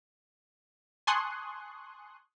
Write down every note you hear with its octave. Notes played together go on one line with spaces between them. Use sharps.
G#5 A5 C6 C#6 D#6 F#6